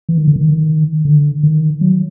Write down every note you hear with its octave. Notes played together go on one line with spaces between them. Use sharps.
E3
D#3
D3
D#3
D3
D#3
F#3